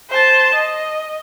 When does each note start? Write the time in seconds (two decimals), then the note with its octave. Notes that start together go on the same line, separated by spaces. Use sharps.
0.10 C5 A5
0.54 D#5